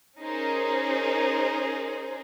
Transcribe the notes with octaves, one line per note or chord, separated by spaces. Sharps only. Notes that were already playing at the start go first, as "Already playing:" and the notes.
C#4 D#4 G#4 A#4 C5